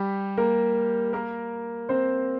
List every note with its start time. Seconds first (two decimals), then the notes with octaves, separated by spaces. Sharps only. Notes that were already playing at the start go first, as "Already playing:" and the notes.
Already playing: G3 G4
0.37 A#3 A#4
1.13 A#3 A#4
1.89 C4 C5